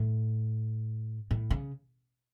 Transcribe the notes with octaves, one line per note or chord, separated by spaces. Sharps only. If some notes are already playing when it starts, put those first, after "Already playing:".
Already playing: A2
A2
C#3